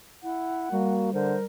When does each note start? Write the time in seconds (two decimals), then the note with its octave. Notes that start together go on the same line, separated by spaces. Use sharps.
0.23 E4 F#5
0.72 G3 A#3 F#4
1.13 D3 A#4 C5